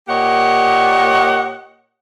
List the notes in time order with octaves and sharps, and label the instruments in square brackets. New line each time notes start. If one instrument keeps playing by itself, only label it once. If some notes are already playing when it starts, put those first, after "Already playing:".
[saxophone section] A#2 A#3 G4 C#5 D#5 F#5